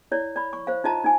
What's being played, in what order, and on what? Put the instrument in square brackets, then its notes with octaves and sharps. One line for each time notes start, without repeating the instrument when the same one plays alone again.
[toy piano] E4 C#5 D5
D5 B5
C#6
C5 F5
D#4 F4 D#5 A5 A#5
D#4 G#5